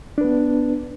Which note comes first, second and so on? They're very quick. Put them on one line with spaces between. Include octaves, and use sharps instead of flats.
D4 B4 B3